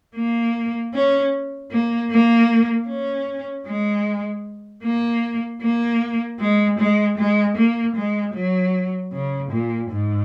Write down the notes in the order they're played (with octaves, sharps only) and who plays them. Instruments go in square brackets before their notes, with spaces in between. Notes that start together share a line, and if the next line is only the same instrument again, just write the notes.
[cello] A#3
C#4
A#3
A#3
C#4
G#3
A#3
A#3
G#3
G#3
G#3
A#3
G#3
F#3
C#3
A#2
G#2